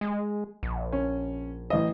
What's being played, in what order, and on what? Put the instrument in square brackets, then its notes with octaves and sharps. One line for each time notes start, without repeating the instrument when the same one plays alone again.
[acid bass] G#3
A#1
[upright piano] C#4
A1 D#5